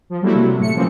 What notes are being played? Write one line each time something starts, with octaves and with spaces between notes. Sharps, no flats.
F3
F#3 G3 A3 A#3 E4 F#4
C3 F#3
A2 A3 C#7
C#3 E3 F3 A#3 C4